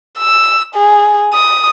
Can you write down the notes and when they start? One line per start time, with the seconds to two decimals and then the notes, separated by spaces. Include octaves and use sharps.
0.18 E6
0.75 G#4
1.33 D#6